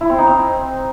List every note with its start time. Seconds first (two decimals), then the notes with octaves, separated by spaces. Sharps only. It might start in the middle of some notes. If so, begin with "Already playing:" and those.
0.01 E4
0.09 C4
0.18 D#4
0.27 C4